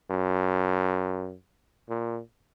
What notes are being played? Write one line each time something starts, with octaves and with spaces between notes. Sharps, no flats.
F#2
A#2